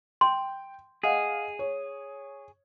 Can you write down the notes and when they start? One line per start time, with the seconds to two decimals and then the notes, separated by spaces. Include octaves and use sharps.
0.21 G5 C6
1.03 G#4 D#5 F5 F#5
1.59 C#5